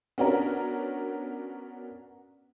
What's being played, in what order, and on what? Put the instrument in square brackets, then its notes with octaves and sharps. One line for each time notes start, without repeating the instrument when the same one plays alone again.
[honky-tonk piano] B3 C#4 D4 F#4 A#4